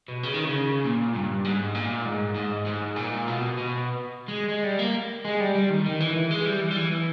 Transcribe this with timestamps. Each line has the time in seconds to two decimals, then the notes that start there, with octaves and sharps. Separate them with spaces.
0.08 B2
0.23 C#3
0.34 D#3
0.45 C#3
0.84 A#2
1.14 G2
1.44 G#2
1.75 A#2
2.06 G#2
2.35 G#2
2.66 G#2
2.96 A#2
3.27 B2
3.57 B2
4.28 G#3
4.49 G#3
4.64 G3
4.79 A#3
5.25 G#3
5.40 G3
5.55 G3
5.70 D#3
5.86 D#3
6.00 E3
6.16 E3
6.31 G#3
6.46 G3
6.61 E3
6.71 G3
6.77 E3
6.92 E3